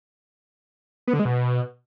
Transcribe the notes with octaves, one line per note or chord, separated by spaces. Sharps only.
B3
D3
G#3
B2